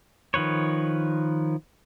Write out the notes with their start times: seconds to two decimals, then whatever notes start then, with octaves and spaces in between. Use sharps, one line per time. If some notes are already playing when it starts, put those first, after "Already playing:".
0.34 D#3 F3 B4 C#5